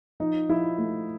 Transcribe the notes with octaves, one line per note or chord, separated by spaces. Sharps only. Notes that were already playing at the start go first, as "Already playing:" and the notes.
F3 D#4
F3 E4
A3